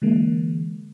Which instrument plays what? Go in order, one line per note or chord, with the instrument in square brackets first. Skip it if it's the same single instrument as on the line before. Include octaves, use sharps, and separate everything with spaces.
[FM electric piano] D3 E3 G#3 A#3